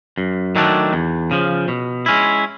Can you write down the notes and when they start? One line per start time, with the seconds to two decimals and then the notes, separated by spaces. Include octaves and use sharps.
0.18 F#2
0.56 D#3 F#3 A3 D4
0.93 E2
1.31 C#3 F3
1.68 B2
2.06 G#3 C#4 E4